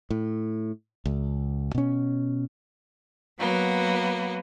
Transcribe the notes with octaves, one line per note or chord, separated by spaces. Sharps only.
A2
C#2
B2 C#4
F#3 A#3 B3